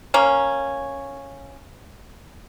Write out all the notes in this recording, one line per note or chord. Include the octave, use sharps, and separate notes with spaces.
A#3 C#4